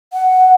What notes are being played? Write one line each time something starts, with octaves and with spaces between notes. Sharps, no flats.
F#5